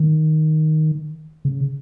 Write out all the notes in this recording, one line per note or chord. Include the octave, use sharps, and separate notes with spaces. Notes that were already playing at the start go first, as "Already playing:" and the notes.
Already playing: D#3
C#3